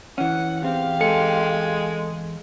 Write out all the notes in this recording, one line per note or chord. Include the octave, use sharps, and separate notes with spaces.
E3 C#4 F#5
E2 C4 G4 F5
G#3 A4 C#7